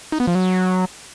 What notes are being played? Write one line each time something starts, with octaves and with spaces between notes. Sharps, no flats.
D#4
B3
F3
F#3